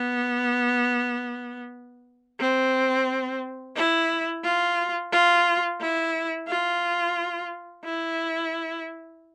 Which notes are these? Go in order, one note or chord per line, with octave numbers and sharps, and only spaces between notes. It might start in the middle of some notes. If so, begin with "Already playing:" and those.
Already playing: B3
C4
E4
F4
F4
E4
F4
E4